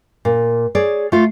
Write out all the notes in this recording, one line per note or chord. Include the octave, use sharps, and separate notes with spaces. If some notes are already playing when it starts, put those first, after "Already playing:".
A#2
G#4 C#5 D5
A3 F4